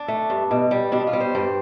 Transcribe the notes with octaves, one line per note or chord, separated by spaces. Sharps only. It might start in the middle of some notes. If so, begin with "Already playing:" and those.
Already playing: D4
A3
G2
B2
G3
B2 D4
F4
G3
C5
G2